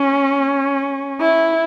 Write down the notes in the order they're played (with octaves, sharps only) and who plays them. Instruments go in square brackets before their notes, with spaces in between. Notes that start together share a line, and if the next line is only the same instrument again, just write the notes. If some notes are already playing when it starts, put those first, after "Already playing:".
Already playing: [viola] C#4
E4